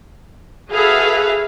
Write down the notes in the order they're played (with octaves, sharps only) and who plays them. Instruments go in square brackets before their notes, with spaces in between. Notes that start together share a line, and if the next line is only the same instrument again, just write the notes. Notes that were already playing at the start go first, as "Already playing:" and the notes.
[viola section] F#4 G#4 A4 B4 E5 F5